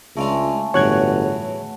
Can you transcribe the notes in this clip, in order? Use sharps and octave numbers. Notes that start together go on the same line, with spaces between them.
C#2 C#3 G#3 A3 D4 F4
G1 E2 A2 F#3 C#5 F#5 F#6 G#6